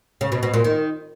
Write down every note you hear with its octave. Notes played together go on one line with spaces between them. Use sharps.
C#3
B2
B2
A#2
D#3